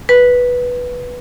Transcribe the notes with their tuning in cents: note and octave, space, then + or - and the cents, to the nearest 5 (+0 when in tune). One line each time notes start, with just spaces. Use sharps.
B4 -5